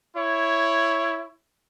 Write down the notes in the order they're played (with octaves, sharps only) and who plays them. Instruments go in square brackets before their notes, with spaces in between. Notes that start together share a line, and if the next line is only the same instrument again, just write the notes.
[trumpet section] E4 C#5